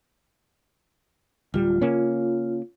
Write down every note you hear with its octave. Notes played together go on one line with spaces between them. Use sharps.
D1 G3 F4
C#3 A#3 C#4